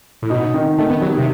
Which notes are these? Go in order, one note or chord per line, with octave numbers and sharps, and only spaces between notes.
A2
B2 D#4
D#3
D#3 A3
B3
F#3 G3
C3